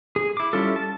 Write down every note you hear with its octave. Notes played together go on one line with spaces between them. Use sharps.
G#4
E4 D6
G3 C#4 E4 F4 A4
A5